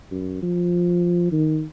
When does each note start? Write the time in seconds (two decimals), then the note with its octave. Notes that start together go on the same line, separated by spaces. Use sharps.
0.12 F#2
0.42 F3
1.32 D#3